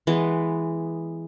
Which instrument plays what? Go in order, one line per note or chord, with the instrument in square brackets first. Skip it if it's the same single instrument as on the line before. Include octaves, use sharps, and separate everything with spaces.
[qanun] E3 G#3 B3